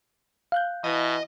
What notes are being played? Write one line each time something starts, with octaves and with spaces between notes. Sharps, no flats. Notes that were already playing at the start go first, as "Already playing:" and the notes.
F5 F#6 G6
B2 E3 D#5